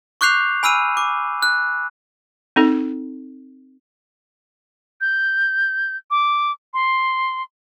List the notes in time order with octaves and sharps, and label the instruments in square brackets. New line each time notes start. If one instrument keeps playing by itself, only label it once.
[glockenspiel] C#6 D6 F#6 G6 C7 F7
G#5 B5 E6 F6 D#7
D6
F#6
[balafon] C4 D#4 A4
[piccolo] G6
D6
C6